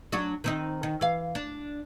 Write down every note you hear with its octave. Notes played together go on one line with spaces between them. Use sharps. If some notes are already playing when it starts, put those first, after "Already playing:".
F#3 D4 F#4
D#3 C4 D#4
D#3
E3 F5
D4